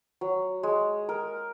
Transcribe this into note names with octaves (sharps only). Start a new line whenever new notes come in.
F#3
G#3
A#4